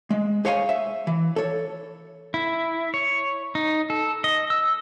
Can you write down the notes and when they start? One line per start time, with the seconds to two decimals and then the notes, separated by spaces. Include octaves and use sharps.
0.10 G#3
0.45 G#4 C5 C#5 F5 G5 G#5
0.69 E5
1.07 E3
1.36 A4 C#5
2.34 E4
2.94 C#5
3.55 D#4
3.90 A4
4.24 D#5
4.50 E6